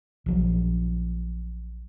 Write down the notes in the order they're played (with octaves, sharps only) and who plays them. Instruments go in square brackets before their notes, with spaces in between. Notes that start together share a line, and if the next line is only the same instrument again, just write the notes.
[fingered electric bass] A#1 F3 F#3